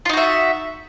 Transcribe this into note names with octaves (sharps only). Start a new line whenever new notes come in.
D#4 F4 F#4 E5